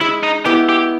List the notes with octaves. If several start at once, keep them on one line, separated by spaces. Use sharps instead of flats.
G#3 E4
D#4
B3 E4 G4
G4